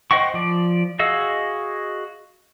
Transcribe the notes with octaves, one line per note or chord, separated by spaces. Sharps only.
C5 D#5 F#5 G5 C#6
F3 D5
F#4 G#4 D#5 F5 E6